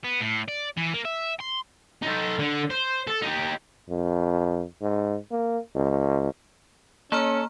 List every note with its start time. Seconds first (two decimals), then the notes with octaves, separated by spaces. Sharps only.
0.04 B3
0.21 A2
0.48 D5
0.77 E3
0.94 A#3
1.05 E5
1.41 C6
2.03 D#4 A4
2.39 D3
2.70 C5
3.08 A4
3.23 D#4 G4
3.90 F2
4.82 G#2
5.31 A#3
5.76 C#2
7.12 A#3 C#4 A4 A#5 F6